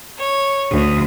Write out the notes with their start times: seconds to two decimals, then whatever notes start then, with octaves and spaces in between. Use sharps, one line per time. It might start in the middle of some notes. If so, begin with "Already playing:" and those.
0.17 C#5
0.71 D2